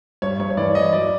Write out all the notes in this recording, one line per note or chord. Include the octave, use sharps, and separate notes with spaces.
G2 C#5
G2 C#5
C#5
E3 D5
E3 D#5
F#3 D5